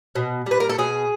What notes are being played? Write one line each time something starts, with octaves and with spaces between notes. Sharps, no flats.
B2
G3 B4
A#4
A4
B2 G#4